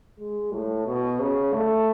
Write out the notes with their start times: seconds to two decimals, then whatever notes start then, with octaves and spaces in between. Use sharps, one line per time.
0.19 G#3
0.53 A2
0.86 B2
1.20 C#3
1.53 A3